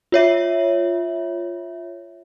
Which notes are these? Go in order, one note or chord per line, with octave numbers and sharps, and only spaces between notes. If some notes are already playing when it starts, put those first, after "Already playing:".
F4 C#5 E5